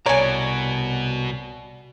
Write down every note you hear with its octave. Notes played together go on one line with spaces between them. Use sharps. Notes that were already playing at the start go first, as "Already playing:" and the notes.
C2 B2 C#5 D5 G#5 A#5